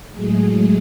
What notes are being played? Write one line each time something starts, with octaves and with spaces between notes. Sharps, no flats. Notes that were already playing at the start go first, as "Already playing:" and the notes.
A2 F#3 G#3 A3 G#4